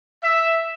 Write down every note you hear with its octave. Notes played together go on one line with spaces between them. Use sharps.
E5